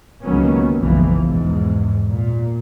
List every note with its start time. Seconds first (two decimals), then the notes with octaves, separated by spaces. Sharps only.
0.24 C#2 D#3 F#3 A#3 B3 C#4
0.79 F#1 B1 B2 E3 F3
1.23 E2 G#2 B2
2.12 A#2